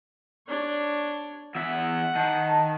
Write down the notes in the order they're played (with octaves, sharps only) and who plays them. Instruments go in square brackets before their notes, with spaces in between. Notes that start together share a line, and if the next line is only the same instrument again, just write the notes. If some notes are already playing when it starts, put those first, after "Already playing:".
[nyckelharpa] D4 C#5
[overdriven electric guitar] E2 E5 [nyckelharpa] F#5
[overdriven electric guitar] D#3 [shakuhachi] A5